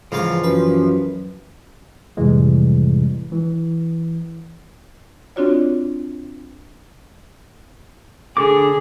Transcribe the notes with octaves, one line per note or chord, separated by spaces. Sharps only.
G#2 C#3 E3 F3 F5
F#2 B4
F2 A2 C3 E3 G3 G#3
E3
C4 D4 F4 F#4 C#5 D5
D3 G#4 A4 D6